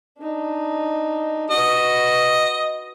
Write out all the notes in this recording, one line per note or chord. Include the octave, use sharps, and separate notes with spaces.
D4 D#4
F#4 B4 D#5